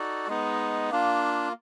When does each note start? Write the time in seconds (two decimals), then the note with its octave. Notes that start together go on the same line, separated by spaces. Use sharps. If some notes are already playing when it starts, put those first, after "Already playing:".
Already playing: D#4 F#4 A4 D5
0.27 G#3 B3 D#4
0.91 A#3 D4 F4